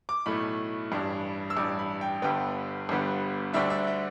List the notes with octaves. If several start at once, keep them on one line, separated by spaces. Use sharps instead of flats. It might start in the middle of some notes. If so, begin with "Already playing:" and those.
D6
B1 A2 A3 B5
A1 G2 G3 D4
E6
A1 G2 G3 D4 D6
B5
G5
G1 G2 D3 G3 B3 G5
G1 G2 D3 G3 B3
D2 D3 G3 D4 E5
E5
E5